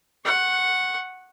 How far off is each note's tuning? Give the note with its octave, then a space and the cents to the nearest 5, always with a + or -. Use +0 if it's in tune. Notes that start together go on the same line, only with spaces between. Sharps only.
F#5 +0 C#6 -30